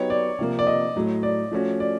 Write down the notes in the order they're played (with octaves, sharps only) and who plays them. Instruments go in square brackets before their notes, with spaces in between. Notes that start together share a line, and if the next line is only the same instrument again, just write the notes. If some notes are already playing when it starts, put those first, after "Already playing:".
Already playing: [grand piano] F#3 B3 D#4 G4 [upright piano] C#5
[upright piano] D5
[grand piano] C3 F3 A#3
[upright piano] D5
D#5
[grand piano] A2 F#3 A3
[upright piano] D5
[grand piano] F3 A3 C#4 F#4
[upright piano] D5